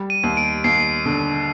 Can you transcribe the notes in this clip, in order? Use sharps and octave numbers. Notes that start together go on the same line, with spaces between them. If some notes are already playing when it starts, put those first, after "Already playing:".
Already playing: G3
D#7
D#2
D7
D#2 C7
D3